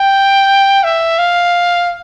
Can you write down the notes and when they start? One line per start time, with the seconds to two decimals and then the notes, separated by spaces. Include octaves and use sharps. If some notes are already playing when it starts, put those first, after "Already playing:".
Already playing: G5
0.84 E5
1.18 F5